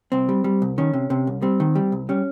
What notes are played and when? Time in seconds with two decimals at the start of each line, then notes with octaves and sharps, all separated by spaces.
0.12 C2 C4
0.29 G3
0.44 G3
0.62 C2
0.78 D#3 C#4
0.93 C3
1.10 C3
1.27 C2
1.42 G3 C4
1.60 D#3
1.75 G3
1.92 C2
2.09 G3 C#4